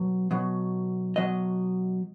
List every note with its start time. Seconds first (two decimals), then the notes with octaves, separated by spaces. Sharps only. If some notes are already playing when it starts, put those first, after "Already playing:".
Already playing: B2 F#3
0.31 B2 F#3
1.16 B2 F#3 D#5